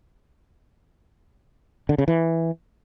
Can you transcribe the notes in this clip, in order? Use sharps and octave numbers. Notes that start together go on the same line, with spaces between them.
D3
C#3
E3